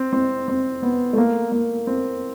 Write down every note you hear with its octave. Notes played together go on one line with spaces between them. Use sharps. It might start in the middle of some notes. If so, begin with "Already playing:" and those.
Already playing: C4
C4
C4
B3
A3
A#3
A#3
C4